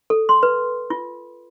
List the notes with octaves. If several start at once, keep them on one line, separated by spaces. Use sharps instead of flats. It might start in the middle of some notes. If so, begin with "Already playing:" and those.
A4
C6
B4
F4